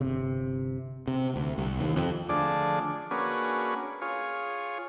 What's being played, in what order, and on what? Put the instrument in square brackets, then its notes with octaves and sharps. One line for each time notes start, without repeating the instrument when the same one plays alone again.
[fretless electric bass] G1 C3
[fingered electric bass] C3
D2
C2
D#2
F2
[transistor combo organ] D3 F3 A3 D4 G#4 D5
A#3 C#4 D4 F#4 G#4 B4
F4 G#4 C#5